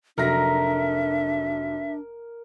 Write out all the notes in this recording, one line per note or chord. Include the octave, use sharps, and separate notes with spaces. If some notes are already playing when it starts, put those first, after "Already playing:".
F1 F#3 D4 A#4 E5 A#6